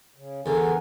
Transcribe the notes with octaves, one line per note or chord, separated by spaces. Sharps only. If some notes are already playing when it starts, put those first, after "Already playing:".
C#3
E2 D3 B3 A#4 G#5